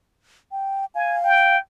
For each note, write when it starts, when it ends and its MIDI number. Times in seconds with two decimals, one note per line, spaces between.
0.52 0.85 79
0.95 1.56 77
0.95 1.23 80
1.24 1.58 79